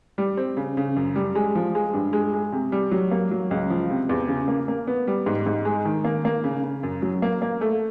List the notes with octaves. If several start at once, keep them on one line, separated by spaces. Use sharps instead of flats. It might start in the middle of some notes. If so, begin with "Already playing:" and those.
G3
C4
C#3
C#3
F#2
G3
G#3
F3
G#3
G2
G#3
G#3
C3
G3
F#3
A#3
F#3
C#2
F3
C3
E2
C#3
A#3
A#3
B3
G3
G#2
G#2
G#3
D#3
A#3
A#3
C#3
C#3
F#2
F#3
A#3
A#3
A3